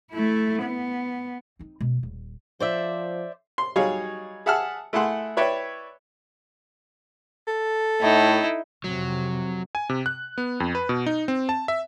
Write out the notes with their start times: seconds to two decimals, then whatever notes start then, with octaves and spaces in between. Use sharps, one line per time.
0.11 A3 E4
0.63 B3
1.59 C4 D#4
1.80 B2
2.03 D#1
2.60 F3 C5 D5 E5
3.58 C6
3.76 F#3 G3 D#4 G#4 C#5 F5
4.46 G#4 E5 F#5 A5 E6 F6
4.93 A3 E4 G#4 F#5 C6
5.37 E4 B4 C#5 D5 E5 G5
7.48 A4
8.01 A2 D#4 E4
8.84 F2 C3 F#3
9.75 G#5
9.89 C3
10.06 F#6
10.38 B3
10.60 F2
10.75 B4
10.89 B2
11.06 D#4
11.28 C4
11.49 A5
11.68 E5